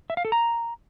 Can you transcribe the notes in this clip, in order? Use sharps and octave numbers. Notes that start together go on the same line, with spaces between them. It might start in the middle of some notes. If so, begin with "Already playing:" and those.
E5
F5
A4
A#5